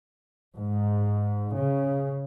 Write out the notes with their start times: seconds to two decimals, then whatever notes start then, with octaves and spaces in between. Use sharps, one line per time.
0.56 G#2
1.57 C#3